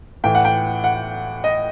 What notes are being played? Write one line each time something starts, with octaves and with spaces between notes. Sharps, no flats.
A2 E3 G5
F#5
G5
F#5
D#5